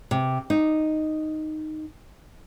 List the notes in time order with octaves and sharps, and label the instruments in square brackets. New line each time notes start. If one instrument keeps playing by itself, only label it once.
[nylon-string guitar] C3
D#4